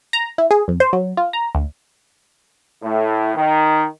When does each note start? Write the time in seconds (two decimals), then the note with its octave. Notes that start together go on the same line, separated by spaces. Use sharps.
0.13 A#5
0.38 E4
0.51 G#4
0.68 F2
0.80 C5
0.93 F#3
1.17 F4
1.33 A#5
1.55 D2
2.83 A2
3.35 D#3